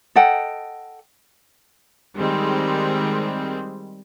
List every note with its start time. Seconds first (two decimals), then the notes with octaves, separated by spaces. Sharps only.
0.15 A4 D#5 F#5 G5
2.17 D#3 G3 G#3 C4